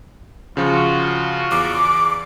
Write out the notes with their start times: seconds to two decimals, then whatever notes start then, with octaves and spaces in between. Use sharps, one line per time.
0.57 C#3 F3 F4 F#4
1.52 E2 D6